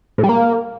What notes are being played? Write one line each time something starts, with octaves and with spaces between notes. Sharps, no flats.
A2
G3
A#3